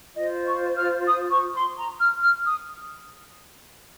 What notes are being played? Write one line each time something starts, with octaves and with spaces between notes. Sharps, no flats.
F4 C5 D#5
C#6
F6
D#6
C#6
C6
A#5
F6
F6
D#6